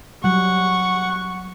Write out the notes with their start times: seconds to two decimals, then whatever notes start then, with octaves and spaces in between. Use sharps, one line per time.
0.24 F#3 G3 F#5 C#6